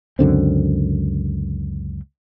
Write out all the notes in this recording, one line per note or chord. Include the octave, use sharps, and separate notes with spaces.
C#2 F#2 D3 C4